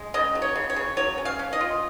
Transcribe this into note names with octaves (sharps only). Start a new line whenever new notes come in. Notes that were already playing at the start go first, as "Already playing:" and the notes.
Already playing: G#3
C#3 D#5
F#3
C#5
C#3
C#5
C#3
F#3 C#5
C#4
F5
C#4
D#5
F4